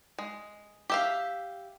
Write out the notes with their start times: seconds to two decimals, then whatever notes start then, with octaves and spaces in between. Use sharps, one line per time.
0.19 G#3
0.90 G4 E5 F5